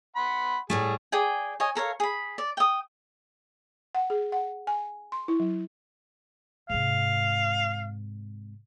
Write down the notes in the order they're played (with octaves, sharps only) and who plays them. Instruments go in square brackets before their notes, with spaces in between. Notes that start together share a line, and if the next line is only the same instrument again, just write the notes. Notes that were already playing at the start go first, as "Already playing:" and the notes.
[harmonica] F#5 B5 C6
[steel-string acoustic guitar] A2 G3 A3 [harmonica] G#4
[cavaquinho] G#4 D5 G5 G#5
C#5 D#5 G#5
A4 A#4 C#5 F5
G#4 B5
D5
G5 D#6
[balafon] F#5
G#4
F#5
G#5
C6
E4
F#3
[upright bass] G#2 C3 [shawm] F5